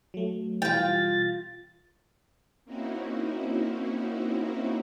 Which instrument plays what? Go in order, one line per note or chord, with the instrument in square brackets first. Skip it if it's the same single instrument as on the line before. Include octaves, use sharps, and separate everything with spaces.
[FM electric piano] F#3 A3
[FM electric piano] B2 E3 G3 [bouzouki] F4 G5 [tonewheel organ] A6
[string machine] A#3 C4 C#4 D#4 E4 F#4